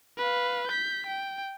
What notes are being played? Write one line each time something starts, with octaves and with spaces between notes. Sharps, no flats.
B4 F5
G6 B6
G5